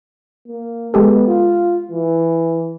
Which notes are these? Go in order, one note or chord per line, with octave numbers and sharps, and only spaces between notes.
A#3
G#3 B3 G4 A4
F4
E3